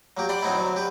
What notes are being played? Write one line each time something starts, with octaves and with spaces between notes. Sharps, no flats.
F#3 A#3 G4
D5 F#5 G5 B5 C6
F#3 B3 C4 D#4 E4
D3 F#3
G4 B4